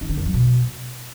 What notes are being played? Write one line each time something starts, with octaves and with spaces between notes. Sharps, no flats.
D#3
D3
E2
F#3
B2